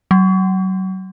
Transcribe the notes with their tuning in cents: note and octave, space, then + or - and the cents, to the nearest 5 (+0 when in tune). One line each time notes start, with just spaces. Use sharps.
F#3 +30